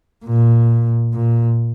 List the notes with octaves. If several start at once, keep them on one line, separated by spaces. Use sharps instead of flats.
A#2
A#2